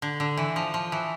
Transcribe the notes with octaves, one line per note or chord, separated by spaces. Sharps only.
D3
D3
E3
F3
F3
E3